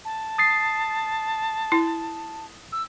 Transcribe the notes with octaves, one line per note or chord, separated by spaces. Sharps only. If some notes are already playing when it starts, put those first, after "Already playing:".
A5
D#6 A6 C7
E4
E6